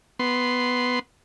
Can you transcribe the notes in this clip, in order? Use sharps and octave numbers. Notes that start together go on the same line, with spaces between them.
B3 C6